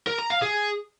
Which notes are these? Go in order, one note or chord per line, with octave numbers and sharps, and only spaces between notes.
A#4
A#5
F5
G#4